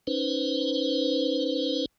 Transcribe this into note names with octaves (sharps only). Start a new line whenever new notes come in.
C#4 D#4 B4 C5